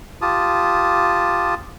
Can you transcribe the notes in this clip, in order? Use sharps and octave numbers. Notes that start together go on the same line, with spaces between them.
F4 G4 A5 D#6